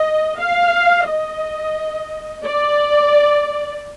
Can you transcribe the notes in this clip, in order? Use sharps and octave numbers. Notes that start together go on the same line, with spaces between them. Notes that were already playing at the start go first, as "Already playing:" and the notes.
Already playing: D#5
F5
D#5
D5